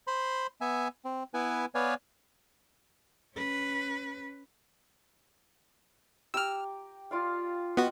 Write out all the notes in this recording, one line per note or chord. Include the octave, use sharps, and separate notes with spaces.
C5 B5 C6
B3 E5 G#5
C4
B3 E4 B4 G#5
B3 B4 C#5 D5 F5 G#5
C#4 B4
G4 A#5 D6 E6 F6
F4 D5 F5
B3 F#4 D#5 F#5 G5